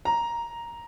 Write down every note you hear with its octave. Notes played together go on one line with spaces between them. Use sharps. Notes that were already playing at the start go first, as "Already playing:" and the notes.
A#5